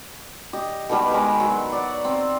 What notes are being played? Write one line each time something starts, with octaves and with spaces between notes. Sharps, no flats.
G4 D#5
B2 D#3 G3 B3
G#3 A#4 B5
F#3 B3
D5 F#5
C4